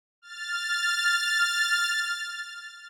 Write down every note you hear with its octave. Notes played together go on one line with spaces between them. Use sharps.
F6 A6